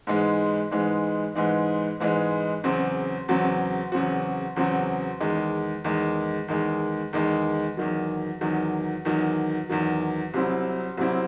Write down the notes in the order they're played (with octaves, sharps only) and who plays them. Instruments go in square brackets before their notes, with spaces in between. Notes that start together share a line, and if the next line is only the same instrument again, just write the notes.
[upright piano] G#2 E3 G#3 D#4
G#2 E3 G#3 D#4
G#2 E3 G#3 D#4
G#2 E3 G#3 D#4
E2 C#3 F#3 C4 F#4
E2 C#3 F#3 C4 F#4
E2 C#3 F#3 C4 F#4
E2 C#3 F#3 C4 F#4
E2 D#3 G#3
E2 D#3 G#3
E2 D#3 G#3
E2 D#3 G#3
E2 D#3 F#3
E2 D#3 F#3
E2 D#3 F#3
E2 D#3 F#3
C2 C3 F#3 C4 E4
C2 C3 F#3 C4 E4